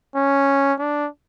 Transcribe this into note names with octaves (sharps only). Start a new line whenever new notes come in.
C#4
D4